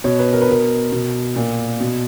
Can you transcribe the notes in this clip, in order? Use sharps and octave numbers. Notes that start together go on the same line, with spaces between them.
B2 C#5
B4
A#4
B4
B2 A#4
B2
A#2
B2